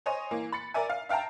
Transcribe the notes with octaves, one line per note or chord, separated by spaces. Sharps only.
C5 C#5 D#5 G#5
E3 A#3
B5 A6 C#7
A#4 D5 E5 G#5
F5
E5 F5 G5 A5 A#5